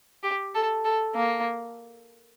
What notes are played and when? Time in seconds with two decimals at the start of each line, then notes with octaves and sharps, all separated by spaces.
0.23 G4
0.55 A4
0.84 A4
1.15 A#3